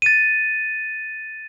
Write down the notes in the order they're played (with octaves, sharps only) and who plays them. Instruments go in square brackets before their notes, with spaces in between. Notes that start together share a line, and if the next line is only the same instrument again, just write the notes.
[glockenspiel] A6 D#7